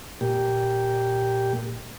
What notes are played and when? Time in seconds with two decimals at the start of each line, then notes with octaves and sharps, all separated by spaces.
0.21 A#2 G4